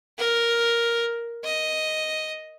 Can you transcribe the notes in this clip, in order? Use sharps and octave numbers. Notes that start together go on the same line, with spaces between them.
A#4
D#5